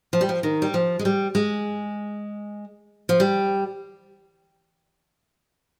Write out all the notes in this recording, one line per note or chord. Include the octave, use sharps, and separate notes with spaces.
F3
G3
F3
D#3
G3
F3
G#3
G3
G#3
F3
G3